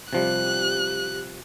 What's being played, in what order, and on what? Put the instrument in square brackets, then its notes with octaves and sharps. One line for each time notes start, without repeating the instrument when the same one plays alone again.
[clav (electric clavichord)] C3 F3 G3 [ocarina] G4 [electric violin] F#6